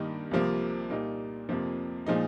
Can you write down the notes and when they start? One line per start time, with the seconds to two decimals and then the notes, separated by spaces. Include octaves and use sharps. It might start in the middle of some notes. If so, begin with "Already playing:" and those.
Already playing: G2 D#3 A#3 D#4
0.31 C2 C3 F3 A#3
0.90 A#2 G3 A#3 D#4
1.49 F2 C3 F3 A#3
2.06 A#2 F3 G#3 D#4